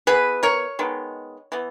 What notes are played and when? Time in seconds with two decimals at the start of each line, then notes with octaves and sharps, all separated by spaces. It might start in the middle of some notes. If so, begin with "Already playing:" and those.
0.07 E3 B3 G#4 B4
0.43 A#4 C#5
0.79 D#3 G#3 B3
1.52 E3 B3